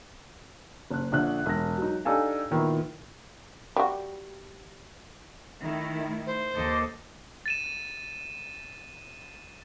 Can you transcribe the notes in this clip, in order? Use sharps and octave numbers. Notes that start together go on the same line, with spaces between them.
F#1 F#6
A#1 D3 F#6
E1 A#6
F#3 D#4
D4 D#4 G4 A4 F5 G#5
A#2 D#3 B3 E4
G3 F#4
D#3 A3 E4
C5
D#2 A4 D#5 D6
A6 D#7 E7